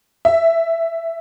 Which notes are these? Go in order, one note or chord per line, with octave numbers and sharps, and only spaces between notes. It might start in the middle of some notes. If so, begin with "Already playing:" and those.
E5